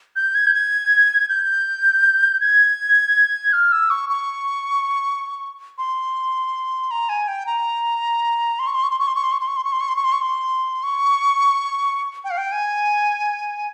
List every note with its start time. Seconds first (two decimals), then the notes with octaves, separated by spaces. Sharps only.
0.16 G6
0.35 G#6
0.47 G6
0.54 G#6
1.29 G6
2.40 G#6
3.53 F6
3.72 E6
3.90 C#6
4.09 C#6
5.78 C6
6.91 A#5
7.09 G#5
7.28 G5
7.46 A#5
8.59 C6
8.67 C#6
8.75 C6
8.83 C#6
8.91 C6
8.99 C#6
9.08 C6
9.16 C#6
9.24 C6
9.32 C#6
9.40 C6
9.48 C#6
9.57 C6
9.64 C#6
9.72 C6
9.81 C#6
9.88 C6
9.96 C#6
10.04 C6
10.12 C#6
10.21 C6
10.83 C#6
12.24 G5
12.30 F5
12.38 G5
12.52 G#5